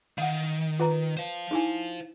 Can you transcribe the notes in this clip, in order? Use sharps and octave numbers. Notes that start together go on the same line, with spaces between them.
D#3 F5 F#5
F4 B4 A#5
C5 F5
D#4 E4 G#5